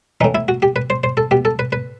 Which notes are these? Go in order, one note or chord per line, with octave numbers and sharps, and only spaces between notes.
A2 E3 D#4
E4
F#4
G4
B4
C5
C5
A4
B2 G4
A4
B4
B4